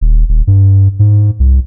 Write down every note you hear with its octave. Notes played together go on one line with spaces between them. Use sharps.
D#1
D#1
G2
G#2
C2